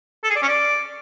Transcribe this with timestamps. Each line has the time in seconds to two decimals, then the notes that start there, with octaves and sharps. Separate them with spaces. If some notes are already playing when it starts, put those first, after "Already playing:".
0.24 A4
0.30 G#4
0.36 D5
0.42 C#4
0.48 D5